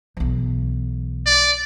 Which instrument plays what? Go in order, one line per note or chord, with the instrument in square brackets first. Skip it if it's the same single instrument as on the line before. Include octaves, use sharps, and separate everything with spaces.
[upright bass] B1 E3
[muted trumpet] D5